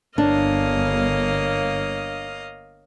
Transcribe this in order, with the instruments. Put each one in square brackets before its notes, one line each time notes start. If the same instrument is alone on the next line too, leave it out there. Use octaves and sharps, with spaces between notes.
[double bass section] G1 [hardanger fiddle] A#3 C#5 [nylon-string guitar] D4 [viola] D#5 F5